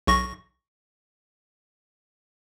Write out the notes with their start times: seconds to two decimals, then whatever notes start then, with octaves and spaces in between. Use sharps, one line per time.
0.07 B1 C#6 A#6